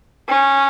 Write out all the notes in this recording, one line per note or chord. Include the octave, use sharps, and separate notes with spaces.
C#4